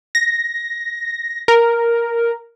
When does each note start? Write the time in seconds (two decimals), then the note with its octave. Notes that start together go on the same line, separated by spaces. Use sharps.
0.15 A#6
1.48 A#4